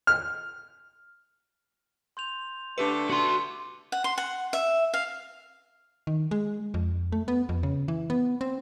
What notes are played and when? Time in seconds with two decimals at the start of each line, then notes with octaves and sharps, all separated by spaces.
0.07 F6
2.17 C6 G6 F7
2.78 D3 G3 A3 D4 G4 B4 D6 C#7
3.10 F#4 C6
3.92 F#5
4.04 C6
4.18 F#5
4.53 E5
4.94 F5
6.07 D#3
6.31 G#3
6.74 F2
7.12 A3
7.28 B3
7.49 F2
7.63 C#3
7.88 E3
8.10 B3
8.41 C4